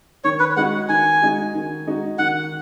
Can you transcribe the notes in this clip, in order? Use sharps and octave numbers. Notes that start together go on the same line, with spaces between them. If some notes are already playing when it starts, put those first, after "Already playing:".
D#3 C#5
B4
G#3 D#4 F#4 F#5
D#3 G#5
G#3 D#4 F#4
D#3
G#3 D#4 F#4
D#3 F#5